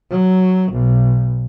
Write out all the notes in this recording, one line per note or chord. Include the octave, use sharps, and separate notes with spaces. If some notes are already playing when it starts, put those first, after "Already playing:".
F#3
B1